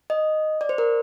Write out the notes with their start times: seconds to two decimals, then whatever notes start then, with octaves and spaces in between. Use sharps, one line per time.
0.10 D#5
0.61 D5
0.69 C5
0.78 A#4